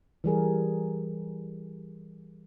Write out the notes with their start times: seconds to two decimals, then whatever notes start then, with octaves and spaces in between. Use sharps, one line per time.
0.24 E3 G3 G#4 A#4